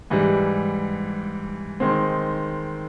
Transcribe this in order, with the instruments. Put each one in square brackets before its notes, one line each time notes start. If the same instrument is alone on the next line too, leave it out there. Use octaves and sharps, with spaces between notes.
[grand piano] G#2 E3 G3
D#3 G#3 C4